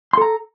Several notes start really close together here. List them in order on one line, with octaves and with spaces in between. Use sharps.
C6 A4 A#5